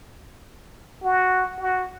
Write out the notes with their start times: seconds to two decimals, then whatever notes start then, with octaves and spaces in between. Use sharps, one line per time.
1.04 F#4
1.60 F#4